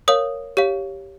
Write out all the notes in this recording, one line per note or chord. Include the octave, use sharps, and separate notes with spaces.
A#4 C#5 F5 D#6
G4 C#5 F5